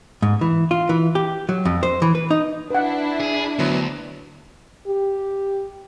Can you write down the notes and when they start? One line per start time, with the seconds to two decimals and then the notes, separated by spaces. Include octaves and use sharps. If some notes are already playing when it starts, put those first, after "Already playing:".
0.22 G#2
0.41 E3
0.71 F4
0.89 E3
1.15 G4
1.49 F#3
1.65 F2
1.83 C5
2.02 E3
2.15 B4
2.31 D#4
2.71 D4 E4 B4 F#5
3.20 G#4
3.59 D2 F#3 B3
4.87 G4